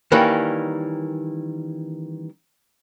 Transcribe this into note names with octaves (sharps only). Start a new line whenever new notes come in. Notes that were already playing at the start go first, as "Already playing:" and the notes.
D#3 E3 G3 A#3 C#4